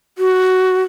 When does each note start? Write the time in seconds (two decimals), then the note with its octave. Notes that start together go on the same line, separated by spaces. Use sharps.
0.18 F#4